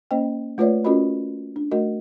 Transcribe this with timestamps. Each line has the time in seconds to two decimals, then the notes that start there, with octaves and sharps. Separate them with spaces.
0.11 A#3 C#4 C5 D#5 G5
0.58 A3 F4 B4 C#5 D5 E5
0.85 C#4 F4 F#4 A#4 D#5 B5
1.56 D4
1.71 A3 F#4 A#4 D#5